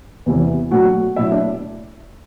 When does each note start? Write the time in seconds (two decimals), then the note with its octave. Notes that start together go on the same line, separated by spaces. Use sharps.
0.26 E2 C3 E3 G3
0.71 B2 F#3 A3 D4 F#4 F#5
1.16 B2 F#3 A3 D4 E4 E5
1.31 D4 D5